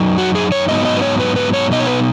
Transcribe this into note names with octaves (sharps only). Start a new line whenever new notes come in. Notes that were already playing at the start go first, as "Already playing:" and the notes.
Already playing: F#2 F#3 D#4
F#4
G#4
C#5
G#2 F#3 B3 D#4 D#5
D#5
B4
C#5
B4
B4
C#5
B2 B3 D#4 D#5
C#5
B4